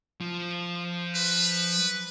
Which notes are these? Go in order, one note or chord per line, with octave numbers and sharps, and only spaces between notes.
F3
B4